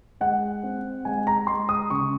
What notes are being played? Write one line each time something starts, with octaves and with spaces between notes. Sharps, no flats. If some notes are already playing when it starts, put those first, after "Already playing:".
G#3 F#5
C4
G#3 G#5
A#5
G#3 C6
D#6
C#3 C#6